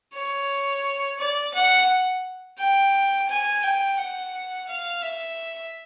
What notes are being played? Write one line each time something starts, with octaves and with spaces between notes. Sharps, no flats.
C#5
D5
F#5
G5
G#5
G5
F#5
F5
E5